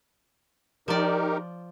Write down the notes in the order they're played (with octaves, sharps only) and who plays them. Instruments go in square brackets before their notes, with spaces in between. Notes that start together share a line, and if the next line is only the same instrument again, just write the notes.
[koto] F3 D5 [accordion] D#4 G4 A#4